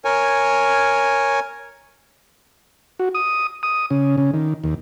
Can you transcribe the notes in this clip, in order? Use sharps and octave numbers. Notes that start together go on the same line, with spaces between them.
A#4 C#5 G#5
F#4
D#6
D#6
C#3
C#3
D#3
D#2